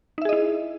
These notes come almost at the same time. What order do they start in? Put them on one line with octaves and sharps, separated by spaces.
D#4 E5 G#4 D#5 E4